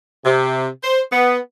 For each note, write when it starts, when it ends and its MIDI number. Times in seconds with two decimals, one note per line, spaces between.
0.25 0.68 48
0.83 1.01 72
1.12 1.39 59